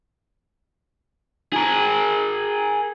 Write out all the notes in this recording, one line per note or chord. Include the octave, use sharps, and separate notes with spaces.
G#4 A#4